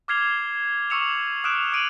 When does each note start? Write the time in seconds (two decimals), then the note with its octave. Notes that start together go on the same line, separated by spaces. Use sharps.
0.08 D6 F6 G#6 C7 F7 G7
0.90 C#6 D6 E6 C#7 E7 F7
1.44 D6 D#6 F6 F#6 D7 E7
1.72 D6 D#6 D7 D#7 F7 F#7